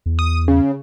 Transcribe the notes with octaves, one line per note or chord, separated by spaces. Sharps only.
E2
D#6
C#3